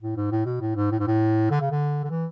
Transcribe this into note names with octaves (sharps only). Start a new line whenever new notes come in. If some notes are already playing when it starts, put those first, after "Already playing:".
A2
G#2
A2
B2
A2
G#2
A2
G#2
A2
D3
C#3
D3
D3
E3